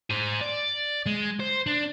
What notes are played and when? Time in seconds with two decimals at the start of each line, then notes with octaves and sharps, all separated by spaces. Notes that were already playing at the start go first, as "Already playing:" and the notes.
0.11 G#4 C5
0.41 D5
1.06 G#3
1.40 C5
1.66 D4